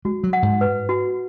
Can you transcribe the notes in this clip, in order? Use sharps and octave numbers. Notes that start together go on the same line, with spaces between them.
G#3 F#4
F#3
F#5
G#2
B4
F#4